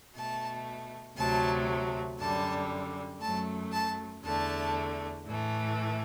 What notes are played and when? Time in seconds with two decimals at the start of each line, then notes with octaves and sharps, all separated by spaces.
0.14 B2 A3 A5
1.17 D2 C3 F#3 A3 A5
2.19 F#2 D3 G3 A5
3.21 F#2 F#3 A3 A5
3.72 A5
4.23 E2 D3 A3 A5
5.26 A2 E3 A3